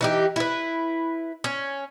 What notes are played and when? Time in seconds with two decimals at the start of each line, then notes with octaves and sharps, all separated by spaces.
0.01 E3 D#4 G4
0.36 E4 B4
1.44 C#4